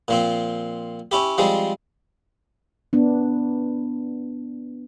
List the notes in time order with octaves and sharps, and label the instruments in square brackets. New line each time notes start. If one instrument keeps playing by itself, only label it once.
[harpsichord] A#2 F3 C4
C#4 E4 G4
F3 G3 G#3 C4
[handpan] B3 D4